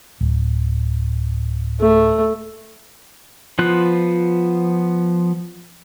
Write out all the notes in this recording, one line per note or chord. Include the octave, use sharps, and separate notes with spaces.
D1
A3
F3 B3 F4 F#6